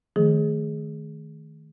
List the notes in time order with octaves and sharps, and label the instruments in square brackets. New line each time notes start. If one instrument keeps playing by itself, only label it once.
[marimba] D#3 F3 A3 G#4